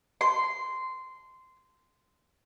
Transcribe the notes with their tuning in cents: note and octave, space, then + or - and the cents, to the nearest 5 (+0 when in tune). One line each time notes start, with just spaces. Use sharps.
C6 -15